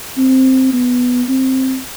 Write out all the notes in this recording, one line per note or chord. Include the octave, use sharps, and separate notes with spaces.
C4
B3
C4